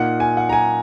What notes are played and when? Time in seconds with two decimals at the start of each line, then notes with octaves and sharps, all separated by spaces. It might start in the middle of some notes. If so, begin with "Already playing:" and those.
Already playing: A#2 A#3 D#4 F#5
0.20 G#5
0.37 F#5
0.49 A#5
0.53 G#5